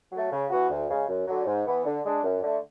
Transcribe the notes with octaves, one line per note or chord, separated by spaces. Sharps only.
F#3 A3
C#3
E3 B3 F#4
D2
C#3 G#3 C#4
F#2
D3 F#3
G#2
E3 B3
D3
G#3 D4
F#2
D3 A3